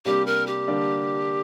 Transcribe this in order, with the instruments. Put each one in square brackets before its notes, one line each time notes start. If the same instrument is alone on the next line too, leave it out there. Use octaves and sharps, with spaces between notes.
[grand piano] C3 G3 A#3 D4 [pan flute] G4
[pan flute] A#4
G4
[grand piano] D3 G3 A#3 D4